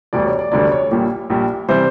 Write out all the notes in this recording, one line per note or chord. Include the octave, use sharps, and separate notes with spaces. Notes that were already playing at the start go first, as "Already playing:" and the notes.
E1 D2 D3 G3 D5
C#5
D5
E1 D2 D3 G3 D5
C#5
A#1 A#2 G3
A#1 A#2 G3
C3 E3 G3 C5